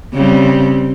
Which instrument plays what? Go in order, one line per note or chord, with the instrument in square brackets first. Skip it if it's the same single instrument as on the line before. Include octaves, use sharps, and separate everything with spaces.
[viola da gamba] C#3 G3 C4